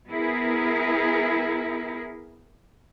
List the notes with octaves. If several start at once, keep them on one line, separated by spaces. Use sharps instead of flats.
B3 E4 G#4 A#4